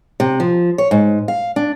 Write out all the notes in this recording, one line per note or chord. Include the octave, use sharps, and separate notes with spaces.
C3
F3
C#5
G#2
F5
D4